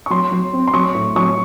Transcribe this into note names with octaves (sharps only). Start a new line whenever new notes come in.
C#6
F#3 C6
F#3
C4
C6
F#3 C#6
A2
F#3 C#6